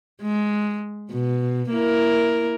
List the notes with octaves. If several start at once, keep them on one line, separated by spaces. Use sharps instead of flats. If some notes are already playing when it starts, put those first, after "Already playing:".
G#3
B2
A#3 E4 A#4